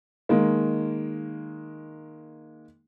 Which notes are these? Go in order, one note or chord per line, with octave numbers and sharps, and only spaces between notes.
D#3 G#3 A#3